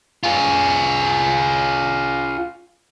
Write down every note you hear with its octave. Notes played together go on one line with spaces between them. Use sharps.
F4 G#4